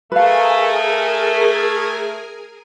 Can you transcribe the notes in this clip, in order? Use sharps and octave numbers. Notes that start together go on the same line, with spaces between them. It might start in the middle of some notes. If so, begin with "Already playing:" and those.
A3 G#4 A#4 B4 F5 G#5